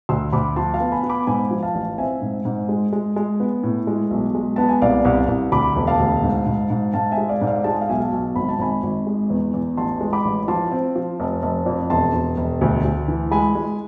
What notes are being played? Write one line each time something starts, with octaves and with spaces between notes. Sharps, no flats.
D2 C6 E6
D2 B5 D6
F3 A5 C6
F5 A5
B3
G#5 B5
B3
B5 D6
G#2 G#5 B5
F3
F5 A5
A1
C4 E5 G#5
G#2
G#2
G#3
G#3
G#3
B3
A2
G#3
B1
G#3
B3 A5
G#5
C2 D5 F5
C2
C2
D2 B5 D6
E1
F5 A5
D2
G#2
G#2
G#2
G#2 F5 A5
E5 G#5
G#3
D5 F5
G#2
D5 F5
G#3 A5
G#5
F5
B1 E5 G#5
F5 A5
B1
G#1 B5
A5
G#1 G#5 B5
G#1
G#3
E2
E2
A1 A5 C6
G#3
B5 D6
A1
F3 A5 C6
C4
F3
F1
F1
F2
E1 A5 C6
E1
E1
D2
D2
E3
G#3 G#5 B5
G#3